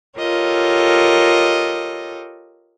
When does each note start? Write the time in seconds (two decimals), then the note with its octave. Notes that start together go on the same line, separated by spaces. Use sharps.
0.19 F4 G4 A4 A#4 C#5 D#5